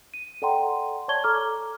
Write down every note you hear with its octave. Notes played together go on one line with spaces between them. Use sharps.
D#7
A4 D5 F#5 G5 A#5 C6
C#5 D5 A5 C#6 G#6 G7
A4 A#5 D6 F6